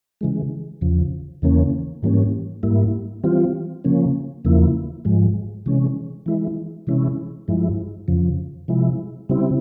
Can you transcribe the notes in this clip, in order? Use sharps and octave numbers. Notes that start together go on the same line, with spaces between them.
C#3 E3 G#3
E2 C#3 F3
E2 C#3 E3 A#3 C#4
G#2 E3 G3 A#3 C#4
G#2 G3 A#3 E4
E3 G3 C4 F4
C#3 F3 A#3 C#4
E2 C#3 F3 A#3 E4
G#2 F3 G#3
C3 E3 G#3 C#4
E3 G#3 E4
C3 E3 G#3 C#4 E4
G2 F3 G#3 E4
F2 C#3 F3
C3 F3 G#3 E4
C#3 G3 C4 E4